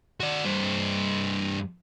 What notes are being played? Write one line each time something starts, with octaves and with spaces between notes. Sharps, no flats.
F#4 D5
G2 C5